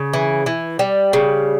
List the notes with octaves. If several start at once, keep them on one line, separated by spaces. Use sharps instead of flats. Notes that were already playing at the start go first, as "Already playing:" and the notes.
Already playing: C#3
E3
E3
G3
C#3